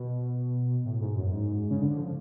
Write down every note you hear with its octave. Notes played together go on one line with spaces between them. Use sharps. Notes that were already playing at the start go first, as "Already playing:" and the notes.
Already playing: B2
A2
G#2
F#2
G#2
C#3
D3
F3